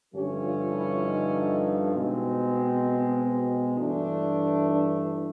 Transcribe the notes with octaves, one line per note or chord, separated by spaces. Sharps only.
G2 D3 F3 A3 C#4 G4
F4
E4
D#4
B2 G#3 C4
G2 E3 A3 D4
D4